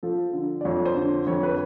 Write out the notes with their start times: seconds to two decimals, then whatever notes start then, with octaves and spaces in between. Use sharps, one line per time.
0.03 F3 A4
0.34 D3
0.61 D5
0.65 F2 C#5
0.86 C5
0.96 D3
1.27 F2 C#5
1.43 B4